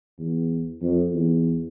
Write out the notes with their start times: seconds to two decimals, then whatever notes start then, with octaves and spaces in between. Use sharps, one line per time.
0.18 E2
0.82 F2
1.13 E2